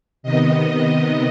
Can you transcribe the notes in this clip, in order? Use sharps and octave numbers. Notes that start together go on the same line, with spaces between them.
C3 D#3 B3 D#5